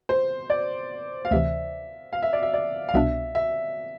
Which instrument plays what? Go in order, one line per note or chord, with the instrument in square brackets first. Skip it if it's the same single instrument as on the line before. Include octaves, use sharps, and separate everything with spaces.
[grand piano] C5
D5
F5
[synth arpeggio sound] D2 C3 E3 [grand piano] E5
[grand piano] F5
E5
D5
E5
D5
F5
[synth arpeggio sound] C2 B2 B3 D4 [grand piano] E5
[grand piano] E5